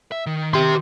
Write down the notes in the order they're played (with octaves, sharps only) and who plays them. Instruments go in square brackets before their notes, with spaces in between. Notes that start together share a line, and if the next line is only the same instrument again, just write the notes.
[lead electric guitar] E5
D#3
[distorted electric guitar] G4 C6